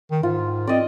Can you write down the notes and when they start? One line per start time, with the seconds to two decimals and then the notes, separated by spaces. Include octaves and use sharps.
0.11 D#3
0.23 G#2 F4
0.67 C4 D5 D#5